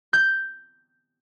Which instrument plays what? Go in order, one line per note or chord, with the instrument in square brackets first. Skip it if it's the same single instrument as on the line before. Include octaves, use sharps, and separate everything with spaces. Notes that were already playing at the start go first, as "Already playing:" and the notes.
[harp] G6